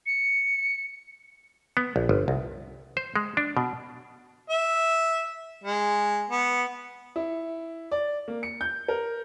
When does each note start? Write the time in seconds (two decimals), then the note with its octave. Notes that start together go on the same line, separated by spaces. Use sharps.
0.06 C#7
1.77 B3
1.96 A#1
2.09 G1
2.28 C2
2.97 C5
3.16 G#3
3.37 D4
3.57 B2
4.50 E5
5.64 G#3
6.29 B3
7.16 E4
7.91 D5
8.28 A#3
8.43 C#7
8.61 G6
8.88 A#4